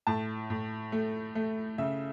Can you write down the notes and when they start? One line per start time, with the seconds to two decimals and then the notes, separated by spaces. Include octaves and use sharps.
0.07 A2 A5
0.50 A2
0.92 A3
1.35 A3
1.78 C#3 E5